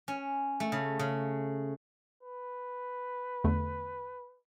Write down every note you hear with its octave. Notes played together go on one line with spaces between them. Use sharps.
C#4
A3
C#3
C#3
B4
E2 D3 A3